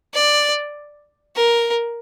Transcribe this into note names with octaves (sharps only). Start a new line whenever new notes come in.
D5
A#4